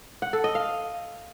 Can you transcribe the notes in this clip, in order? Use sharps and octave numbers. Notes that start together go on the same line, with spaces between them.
F#5
A4
D#5
F5